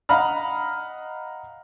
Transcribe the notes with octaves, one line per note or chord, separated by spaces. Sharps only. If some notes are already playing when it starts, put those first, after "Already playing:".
D#5 F5 F#5 A#5 B5 F6